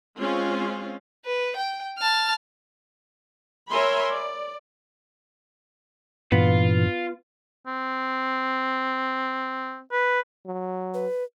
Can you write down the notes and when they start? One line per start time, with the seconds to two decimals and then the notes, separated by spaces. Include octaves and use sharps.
0.19 G#3 C4 C#4 F4
1.25 B4
1.56 G5
1.98 A5 F6
3.69 A#4 C#5 E5 G#5 B5 C6
4.11 D5
6.32 G2 A#2 E3 B3 F4
7.67 C4
9.92 B4
10.46 F#3
10.94 B4